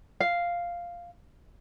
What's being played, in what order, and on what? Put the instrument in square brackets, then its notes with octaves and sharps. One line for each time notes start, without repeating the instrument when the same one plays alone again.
[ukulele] F5